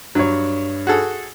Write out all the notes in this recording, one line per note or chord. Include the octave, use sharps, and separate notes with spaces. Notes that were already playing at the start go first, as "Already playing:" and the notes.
G2 F#3 C#5
F#4 G#4 A4